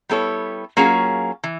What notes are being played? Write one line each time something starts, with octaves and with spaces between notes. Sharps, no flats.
G3 B3 E4 A4 C#5
F#3 A#3 C#4 F4 G#4
E3